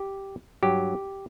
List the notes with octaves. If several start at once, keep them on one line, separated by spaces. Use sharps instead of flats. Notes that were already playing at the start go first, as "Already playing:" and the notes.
Already playing: G4
G2 F#3 G4